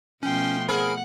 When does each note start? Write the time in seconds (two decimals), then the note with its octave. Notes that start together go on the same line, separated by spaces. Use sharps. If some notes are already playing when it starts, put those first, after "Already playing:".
0.23 B2 F3 A3 C#4 G5 C6
0.68 C4 G#4 A#4 F#5 B5 F6